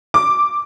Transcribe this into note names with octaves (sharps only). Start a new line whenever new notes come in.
D6